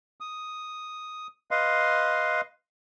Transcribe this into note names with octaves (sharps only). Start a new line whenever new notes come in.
D#6
B4 D#5 F5 C6